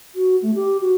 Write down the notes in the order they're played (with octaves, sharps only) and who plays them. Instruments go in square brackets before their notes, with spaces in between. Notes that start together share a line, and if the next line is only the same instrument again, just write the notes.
[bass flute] F#4
A3
G4
F#4